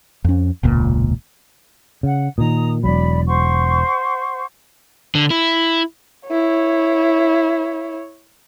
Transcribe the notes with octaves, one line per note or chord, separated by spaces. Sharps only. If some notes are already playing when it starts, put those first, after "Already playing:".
F2 C#4
E1 C#2 A#2
C#3 F#5
A#2 D#3 A#5 D#6
E1 C#2 F#3 D5 B5
C5 F#5 C#6
D3
E4
E4 C#5